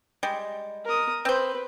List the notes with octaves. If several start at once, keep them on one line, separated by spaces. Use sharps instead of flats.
G3 G#3
A#4 D#6
C4 B4 C5